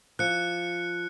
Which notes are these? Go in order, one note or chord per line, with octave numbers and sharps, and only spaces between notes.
F3 F#6 C#7